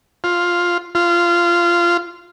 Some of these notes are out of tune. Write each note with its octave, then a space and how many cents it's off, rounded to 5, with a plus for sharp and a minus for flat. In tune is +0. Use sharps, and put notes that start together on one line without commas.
F4 +5
F4 -15